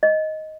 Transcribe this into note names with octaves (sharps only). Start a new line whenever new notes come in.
D#5